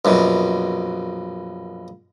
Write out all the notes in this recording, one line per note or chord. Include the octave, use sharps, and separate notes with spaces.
A#1 F#2 B2